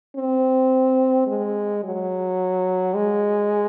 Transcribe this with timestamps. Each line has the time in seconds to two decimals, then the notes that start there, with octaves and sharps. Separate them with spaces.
0.16 C4
1.27 G#3
1.84 F#3
2.94 G#3